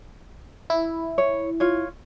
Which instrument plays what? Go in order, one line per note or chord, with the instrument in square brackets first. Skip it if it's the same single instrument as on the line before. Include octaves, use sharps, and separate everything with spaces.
[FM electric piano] E4
[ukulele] C#5
F4 C#5